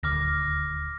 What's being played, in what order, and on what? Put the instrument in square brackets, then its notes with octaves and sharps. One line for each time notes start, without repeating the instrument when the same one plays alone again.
[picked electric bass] D#1 D2 [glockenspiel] D6 F6 A#6